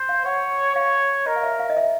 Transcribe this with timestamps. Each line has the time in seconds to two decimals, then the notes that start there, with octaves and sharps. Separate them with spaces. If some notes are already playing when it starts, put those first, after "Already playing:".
Already playing: C5
0.09 F5
0.25 C#5 F#5
0.75 C#5 F5
1.26 A#4 D#5
1.36 F5
1.43 E5
1.59 F5
1.70 D#5
1.77 E5